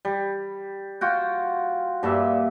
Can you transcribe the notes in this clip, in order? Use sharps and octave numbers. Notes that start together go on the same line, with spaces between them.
G3
F4 F#4 G5
G2 A#2 E5